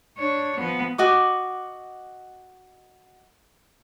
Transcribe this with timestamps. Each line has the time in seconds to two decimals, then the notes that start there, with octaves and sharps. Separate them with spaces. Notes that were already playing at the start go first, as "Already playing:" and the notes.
0.18 D4 C#5
0.59 F3 B3
0.98 F#4 D#5 D6